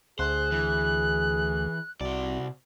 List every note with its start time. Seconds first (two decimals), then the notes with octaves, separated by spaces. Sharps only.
0.19 D2 G#4 C5 F#6
0.51 E3
2.01 C2 C3 F#4 D5